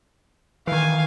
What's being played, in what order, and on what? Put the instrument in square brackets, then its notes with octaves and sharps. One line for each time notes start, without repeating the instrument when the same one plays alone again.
[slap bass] D#3 E3 [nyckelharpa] F5 G#5